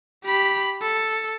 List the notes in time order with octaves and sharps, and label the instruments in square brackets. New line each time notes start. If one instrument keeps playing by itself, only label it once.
[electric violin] G4 B5
A4